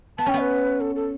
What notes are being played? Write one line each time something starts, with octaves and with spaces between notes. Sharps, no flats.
B3 A5
C#4 G5
B3
B4
A4
A4